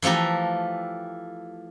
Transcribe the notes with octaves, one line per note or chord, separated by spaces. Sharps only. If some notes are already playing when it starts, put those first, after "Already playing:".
E3 F3 A3 G4 A#5